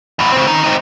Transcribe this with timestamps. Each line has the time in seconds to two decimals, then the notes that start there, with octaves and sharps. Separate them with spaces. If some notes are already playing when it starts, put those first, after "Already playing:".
0.19 E2 A2
0.32 C#3 C4
0.47 D#3
0.64 C4 D#4